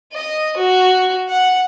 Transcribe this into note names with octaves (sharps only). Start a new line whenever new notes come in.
D#5
F#4
F#5